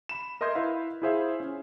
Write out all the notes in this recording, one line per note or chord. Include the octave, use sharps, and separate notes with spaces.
B5 E7
A#4 D#5 E5 C6 G6 G#6
E4 B4 E5 F5
E4 F4 G#4 C5 E5 F5
C#4